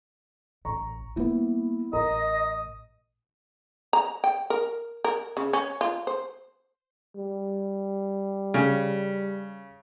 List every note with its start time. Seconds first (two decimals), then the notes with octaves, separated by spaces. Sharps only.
0.65 A1 A#5 C#6
1.16 G3 A#3 B3 E4
1.93 A1 A#4 D#5 A#5 D#6
3.93 A#5
4.24 G5
4.50 A#4
5.04 A#4
5.37 C#3
5.53 C#4
5.81 F4
6.07 C5
7.15 G3
8.54 C#3